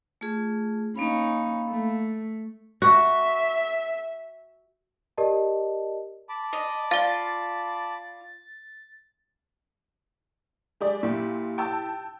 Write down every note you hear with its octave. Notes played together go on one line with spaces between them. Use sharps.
A3 F4 G#4
A#3 C#4 D#4 F5 B5
A3
F#4 E5
G4 A#4 D5 D#5 A5
A5 B5 D6
D#5
F4 D5 F5 A6 G7
G#3 G4 D5
A#2 E4 G4
G5 A5 E6